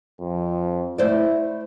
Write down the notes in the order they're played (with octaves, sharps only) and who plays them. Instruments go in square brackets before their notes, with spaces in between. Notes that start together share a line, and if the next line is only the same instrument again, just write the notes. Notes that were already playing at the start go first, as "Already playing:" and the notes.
[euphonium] F2
[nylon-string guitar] A3 C5 D5 [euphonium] E4